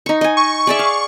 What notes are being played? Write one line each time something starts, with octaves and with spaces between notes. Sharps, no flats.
D#4 C#6
D#5 G#5
C#6
G#4 D5 E5
F5